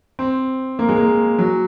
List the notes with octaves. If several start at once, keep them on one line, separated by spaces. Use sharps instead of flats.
C4
A#3
G#3
A#3
F#3